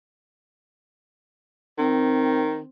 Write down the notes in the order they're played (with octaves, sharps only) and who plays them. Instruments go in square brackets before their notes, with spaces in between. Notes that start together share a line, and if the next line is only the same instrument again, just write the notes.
[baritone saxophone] D#3 [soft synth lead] C4